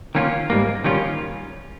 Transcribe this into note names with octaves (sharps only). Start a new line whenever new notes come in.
D#3 A#3 C#4 F4
G#2 G3 A#3
D#3 G3 C#4 F4